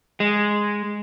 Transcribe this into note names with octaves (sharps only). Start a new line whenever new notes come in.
G#3